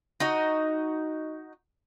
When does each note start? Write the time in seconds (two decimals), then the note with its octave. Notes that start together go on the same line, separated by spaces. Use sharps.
0.20 D#4 F#4 D#5